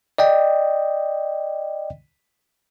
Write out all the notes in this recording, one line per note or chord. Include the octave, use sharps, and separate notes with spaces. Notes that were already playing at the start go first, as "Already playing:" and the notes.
D5 D#5 G5